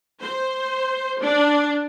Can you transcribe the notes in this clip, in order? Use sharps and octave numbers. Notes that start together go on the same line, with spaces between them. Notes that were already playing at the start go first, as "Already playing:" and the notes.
C5
D4